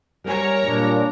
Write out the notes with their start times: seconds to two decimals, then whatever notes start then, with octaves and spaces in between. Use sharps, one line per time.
0.24 G3 A#4 C#5 F#5 G#5 A#5
0.62 A#2 G3 G#3 D4